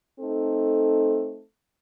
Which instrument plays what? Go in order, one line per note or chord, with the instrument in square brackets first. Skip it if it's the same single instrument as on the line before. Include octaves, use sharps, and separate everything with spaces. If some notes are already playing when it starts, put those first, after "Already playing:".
[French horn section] A3 C4 D#4 A4